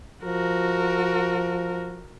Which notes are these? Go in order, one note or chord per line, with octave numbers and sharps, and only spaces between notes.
F3 F#4 A#4